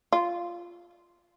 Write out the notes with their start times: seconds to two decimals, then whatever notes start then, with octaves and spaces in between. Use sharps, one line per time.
0.13 F4